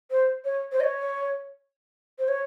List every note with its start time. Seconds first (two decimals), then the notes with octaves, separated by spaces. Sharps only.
0.11 C5
0.45 C#5
0.72 C5
0.80 D#5
0.83 C#5
2.19 C5
2.28 C#5